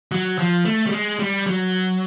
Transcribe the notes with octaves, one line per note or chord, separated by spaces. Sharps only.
F#3
F3
A3
G3
G#3
G3
F#3